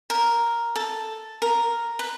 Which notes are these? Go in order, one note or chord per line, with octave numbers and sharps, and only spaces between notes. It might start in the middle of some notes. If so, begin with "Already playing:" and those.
A#4
A4
A#4
B4